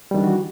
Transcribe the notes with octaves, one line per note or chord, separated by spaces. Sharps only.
D#3 E3 G3 D4 F#4